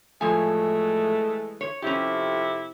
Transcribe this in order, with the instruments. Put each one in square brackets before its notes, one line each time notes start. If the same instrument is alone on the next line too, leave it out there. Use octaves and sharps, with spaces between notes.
[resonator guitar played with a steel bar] A2 F3 G#5 [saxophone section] E3 G#3 A3
[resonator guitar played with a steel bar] C#5
[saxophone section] F2 C3 E4 [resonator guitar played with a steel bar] C#4 G4